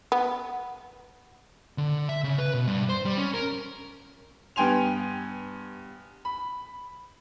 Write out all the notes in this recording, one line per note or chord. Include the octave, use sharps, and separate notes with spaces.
B3
D3
E5
C#3
B4
B2
G2
C5
G3
C#4
A#4
G2 B3 G5 G#5 C6 F7
B5